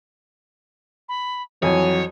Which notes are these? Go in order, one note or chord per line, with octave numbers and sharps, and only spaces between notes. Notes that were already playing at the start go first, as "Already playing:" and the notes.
B5
F2 E3 F#3 C#5 G#5